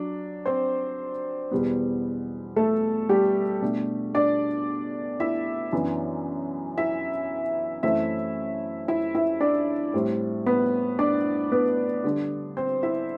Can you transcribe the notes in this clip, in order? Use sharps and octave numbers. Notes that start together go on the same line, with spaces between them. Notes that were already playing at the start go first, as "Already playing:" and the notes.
Already playing: F#3 D4
C4 C5
E2 B2 G3 B3
A3 A4
G3 G4
B2 A3 D4
D4 D5
E4 E5
F#2 E3 B3 D4
E4 E5
F#2 E3 A3 C4 E4 E5
E4 E5
E4 E5
D4 D5
A2 G3 C4
B3 B4
D4 D5
B3 B4
D3 G3 D4
C4 C5
E4 E5